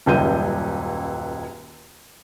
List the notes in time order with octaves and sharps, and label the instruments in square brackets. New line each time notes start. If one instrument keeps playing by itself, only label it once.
[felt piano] D#1 C#2 F#2 G3 G6 D#7